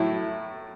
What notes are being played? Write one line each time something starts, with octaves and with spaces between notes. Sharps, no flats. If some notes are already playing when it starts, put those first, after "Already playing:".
Already playing: A2 F#3 A3 E4